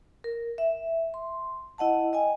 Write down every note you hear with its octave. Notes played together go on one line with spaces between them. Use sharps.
A#4
E5
C6
E4 D#5 F#5 A5
D#5 G5 G#5